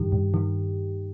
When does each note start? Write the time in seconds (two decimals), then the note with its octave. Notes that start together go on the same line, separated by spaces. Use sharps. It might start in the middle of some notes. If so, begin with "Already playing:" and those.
Already playing: G2 D#3 G4
0.12 G2
0.34 D#3